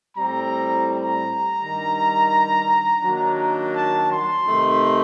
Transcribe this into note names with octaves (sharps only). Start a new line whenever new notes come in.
A2 G3 C4 A#5
A#5
G2 D#3 G3
D#3 F#3 A#3 D4
A5
C6
C3 D#3 A3 D#4